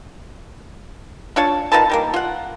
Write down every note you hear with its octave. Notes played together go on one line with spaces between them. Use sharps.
D4 F4 C#5 A5
D#3 F4 B4 A5
D#3 G3 A#3
F4 F#5